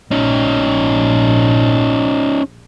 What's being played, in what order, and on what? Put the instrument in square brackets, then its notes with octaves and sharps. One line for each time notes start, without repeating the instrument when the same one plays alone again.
[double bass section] A#1 [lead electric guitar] C#4 D#4